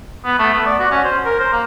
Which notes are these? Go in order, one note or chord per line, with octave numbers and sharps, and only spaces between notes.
B3
A3
B3
D5
F#4
C#4
C5
A#4
C5
A#3